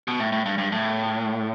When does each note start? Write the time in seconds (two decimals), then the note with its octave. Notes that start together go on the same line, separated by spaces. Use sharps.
0.08 B2
0.20 A2
0.32 A2
0.46 G2
0.58 G2
0.72 A2